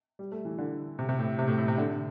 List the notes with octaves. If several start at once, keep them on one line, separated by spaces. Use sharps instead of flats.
G3
A3
E3
D3
C3
C3
A2
C3
A2
A2
C3
D3